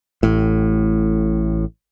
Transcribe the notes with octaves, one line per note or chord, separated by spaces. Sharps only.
A1 A2